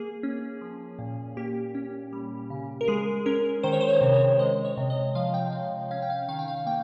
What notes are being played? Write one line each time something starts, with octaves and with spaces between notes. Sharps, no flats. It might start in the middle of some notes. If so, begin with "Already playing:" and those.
Already playing: A#3 G#4
C#4
F3
A#2
A#3 G4
C#4
G3
C#3
A#4
G#3 G#4
C#4 A#4
D#3 C5
C#5
C5
C#5
C3
C#5
G#3 D#5
C#5
C3
D#5
F3 F5
G5
C3 F5
C#4 F5
G5
F5
D#3 F5
G5
F5
A#3 G5